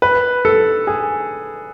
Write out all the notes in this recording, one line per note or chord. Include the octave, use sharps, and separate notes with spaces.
B4
A4
G#4